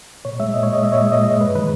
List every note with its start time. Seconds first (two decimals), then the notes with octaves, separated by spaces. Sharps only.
0.25 A#2 C#5
0.40 G#3 E5
0.54 A#2 D#5
0.63 C#5
0.69 G#3 D#5
0.83 A#2 E5
0.92 C#5
0.97 G#3 D#5
1.12 A#2 D#5
1.26 G#3
1.41 G2 B4
1.55 D#3 G#3 B4